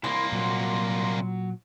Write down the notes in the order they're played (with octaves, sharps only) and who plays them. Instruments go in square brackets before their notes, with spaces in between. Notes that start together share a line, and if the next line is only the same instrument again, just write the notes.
[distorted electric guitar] C2 A#3 [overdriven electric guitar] E4 B5 [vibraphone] C6
[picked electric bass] A#2 [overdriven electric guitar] F#3